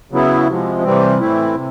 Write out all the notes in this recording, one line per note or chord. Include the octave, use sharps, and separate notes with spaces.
C#3 F#3 B3 E4
C3 F3 G#3
C3 E3 G3 C4
A2 E3 A3 C4 E4
C3